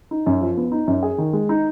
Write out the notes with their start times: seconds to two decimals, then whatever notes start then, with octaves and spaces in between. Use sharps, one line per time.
0.11 D#4
0.26 F#2
0.41 F3
0.57 B3
0.72 D#4
0.88 F#2
1.03 G#4
1.18 D#3
1.33 G#3
1.49 D#4